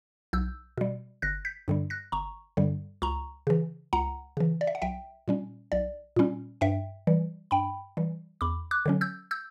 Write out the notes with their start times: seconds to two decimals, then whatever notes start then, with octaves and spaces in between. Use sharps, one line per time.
0.33 B1 E6 G6
0.78 B2 G3
1.22 G1 F#6 A#6
1.45 G6 B6
1.68 G2 D3 G3
1.90 F#6 A#6
2.12 G1 A#5 C#6
2.57 G2 D3 G3
3.02 C#2 A#5 C#6
3.47 C#3 E3
3.93 C#2 F#5 A#5
4.37 C#3 E3
4.61 D5
4.67 E5
4.75 F#5
4.82 B1 E5 G5
5.28 A#2 G3 C#4
5.72 B1 D5
6.16 A#2 G3 C#4
6.61 G2 E5 G5
7.07 E3 G3
7.51 G2 G5 B5
7.97 E3 G3
8.41 E2 B5 D6
8.71 D6 F#6
8.86 D3 F#3 C#4
9.01 E6 G6
9.31 E6 G6